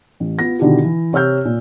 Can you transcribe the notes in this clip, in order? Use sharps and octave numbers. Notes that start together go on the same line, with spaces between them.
A1
B3 F4 A#6
B2 D3 D#3 D4 E4 G4
E3
C3 C#5 E6 F6 G6
A#2